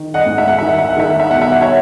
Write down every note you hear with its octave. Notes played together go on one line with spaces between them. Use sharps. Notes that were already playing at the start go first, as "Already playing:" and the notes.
Already playing: D#3
D#5 F#5
G#2
E5
F#5
D#3 E5
F#5
E5
F#5
D#3 E5
F#5
E5
B2 F#5
E5
F#5
C#5 E5